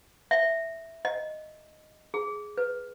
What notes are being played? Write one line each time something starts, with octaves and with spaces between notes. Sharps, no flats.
E5
D#5
G#4
B4